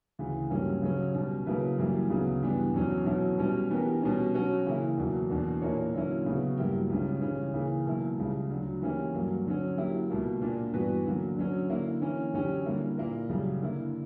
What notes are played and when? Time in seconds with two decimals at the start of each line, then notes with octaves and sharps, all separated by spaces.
0.19 D2 C#3 E3
0.50 G2 F#3 A#3 C#4 G4
0.82 C#3 F#3 C#4
1.14 B2 G3 C#4
1.46 C#3 F#3 A#3 E4 B4
1.78 F#2 E3 G3 A#3 E4
2.10 D2 C#3 F#3 B3 D4
2.42 G2 E3 B3 D4 G4
2.74 E2 B2 F#3 C#4
3.06 B2 F#3 C#4 E4
3.38 B2 G3 C#4
3.70 E3 B3 D4 G4 A#4
4.02 B2 G3 C#4
4.34 F#3 C#4 F#4
4.66 C#3 E3 A#3 E4
4.98 E2 B2 F#3 A#3
5.30 E2 B2 A#3 D4
5.62 A#2 A#3 E4 A#4 C#5
5.94 D3 F#3 A#3 C#4 E4
6.26 C#3 F#3 B3 F#4
6.57 G2 F#3 A#3 E4 G4
6.89 C#2 C#3 G3 C#4
7.22 C#3 E3 G3 C#4
7.54 C#3 E3 A#3
7.85 B2 F#3 A#3 E4
8.18 C#2 C#3 G3
8.50 D2 D3 F#3
8.82 E3 A#3 C#4 E4 G4
9.13 G2 F#3 A#3
9.46 D3 F#3 C#4
9.78 F#3 A#3 E4 G4
10.10 C#2 B2 A#3
10.42 A#2 A#3 D4
10.73 G2 E3 B3 F#4 B4
11.05 D3 F#3 A#3
11.37 D3 F#3 C#4
11.70 D3 A#3 E4
12.01 E3 A#3 C#4
12.33 F#2 D3 F#3 C#4 G4
12.65 D3 G3 A#3 E4
12.98 A#2 A#3 E4 A#4
13.29 F#2 C#3 G3
13.61 D3 A#3 E4